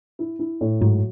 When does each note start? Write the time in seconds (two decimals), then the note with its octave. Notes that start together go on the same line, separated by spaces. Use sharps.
0.19 E4
0.39 E4
0.61 A2
0.81 G#2 F#3